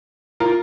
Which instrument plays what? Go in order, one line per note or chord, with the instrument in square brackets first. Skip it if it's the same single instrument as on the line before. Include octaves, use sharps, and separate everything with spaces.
[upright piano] F4 A#4